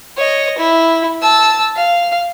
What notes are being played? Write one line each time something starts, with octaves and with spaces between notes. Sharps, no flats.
C#5 D#5
E4
A5 E6
F5